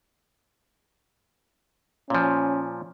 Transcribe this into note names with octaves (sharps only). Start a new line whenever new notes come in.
A#2 F3 C#4